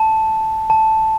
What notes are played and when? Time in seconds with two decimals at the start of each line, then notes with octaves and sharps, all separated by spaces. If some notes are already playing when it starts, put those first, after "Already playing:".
Already playing: A5
0.70 A5